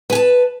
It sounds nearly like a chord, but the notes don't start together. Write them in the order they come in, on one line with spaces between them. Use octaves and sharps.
B4 G#5 A5